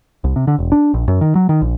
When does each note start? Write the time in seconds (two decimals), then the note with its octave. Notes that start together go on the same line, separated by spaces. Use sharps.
0.24 C2
0.36 C3
0.47 D3
0.58 E1
0.72 D4
0.94 A#1
1.08 F#2
1.21 D#3
1.35 F#3
1.49 D#3
1.62 A#1